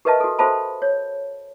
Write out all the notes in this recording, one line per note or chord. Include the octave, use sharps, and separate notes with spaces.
G4 A#4 B4 D#5 E5 A5
F#4 A4
F#4 A4 C5 E5 A5 B5
C#5